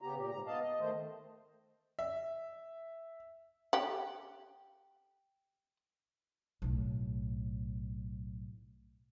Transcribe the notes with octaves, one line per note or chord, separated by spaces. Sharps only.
C#3 B3 G4 A#5
A#2 G4
G#2 A#5
B3 D#5 F5 A5
D#5
D#3 A3 C5
E5
G4 F#5
B1 A2